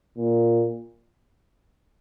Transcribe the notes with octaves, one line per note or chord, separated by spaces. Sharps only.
A#2